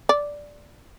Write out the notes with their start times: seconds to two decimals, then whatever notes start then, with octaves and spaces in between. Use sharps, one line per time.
0.09 D5